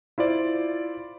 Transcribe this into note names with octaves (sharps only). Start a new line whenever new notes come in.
E4 F4 C5 D5